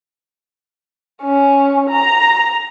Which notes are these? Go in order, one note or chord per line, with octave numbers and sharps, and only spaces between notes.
C#4
A#5